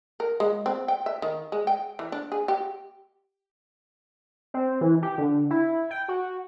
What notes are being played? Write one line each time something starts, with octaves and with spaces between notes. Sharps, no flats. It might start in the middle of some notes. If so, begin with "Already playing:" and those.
A#4
G#3
C4
G5
E5
D#3
G#3
G5
E3
D4
G#4
G4
C4
E3
G4
D3
E4
G5
F#4